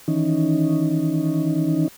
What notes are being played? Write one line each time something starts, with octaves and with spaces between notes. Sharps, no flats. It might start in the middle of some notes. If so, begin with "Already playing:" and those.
D#3 E3 C#4 D#4